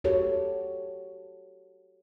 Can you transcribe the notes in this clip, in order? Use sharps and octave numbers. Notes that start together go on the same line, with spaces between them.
F#4 G4 A4 C#5